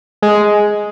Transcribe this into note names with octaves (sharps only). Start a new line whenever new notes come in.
G#3